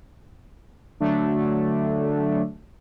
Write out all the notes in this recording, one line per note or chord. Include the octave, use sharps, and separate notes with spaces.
D3 F#3 A3 D4